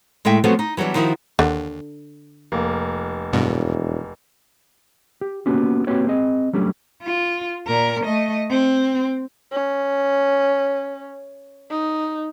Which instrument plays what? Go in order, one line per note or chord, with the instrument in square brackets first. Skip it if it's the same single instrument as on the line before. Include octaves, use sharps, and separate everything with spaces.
[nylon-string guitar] A2 G#3 A3 E5 G5
F3 F#3 A3 B3 C4 F#4
D#4
E3 F#3 G3 B3 D4
D#3 F3 D#4 E4 F#4
[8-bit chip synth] D#2 [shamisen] D3
[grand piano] F1 A#3
[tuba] E1 [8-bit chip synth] G2 B2
[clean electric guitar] G4
A#3 B3 C#4 F#4 G4
A#3 C4 F#4 G4 B4 C#5
C4 G#4 D#5
F#3 G3 A3 C#4 D4 G4
[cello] F4
A#2 A#4
A3 D#5
C4
[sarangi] C#4
D#4